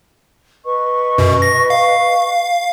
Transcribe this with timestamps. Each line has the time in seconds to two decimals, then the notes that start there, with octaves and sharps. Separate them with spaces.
0.65 B4 D#5 C#6
1.18 F#2 B2
1.42 A#6
1.70 F5